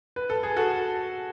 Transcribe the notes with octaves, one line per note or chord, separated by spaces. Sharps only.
B4
A4
G#4
F#4 A4